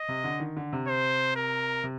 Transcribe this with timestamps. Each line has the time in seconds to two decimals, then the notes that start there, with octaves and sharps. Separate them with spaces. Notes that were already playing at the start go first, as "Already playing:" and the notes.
Already playing: D#5
0.09 C3
0.24 D3
0.40 D#3
0.57 D3
0.73 C3
0.88 C5
1.36 A#4
1.84 C3